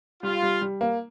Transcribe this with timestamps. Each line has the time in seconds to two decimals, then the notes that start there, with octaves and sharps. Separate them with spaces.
0.23 G3 F4
0.43 G3
0.61 G3
0.81 A#3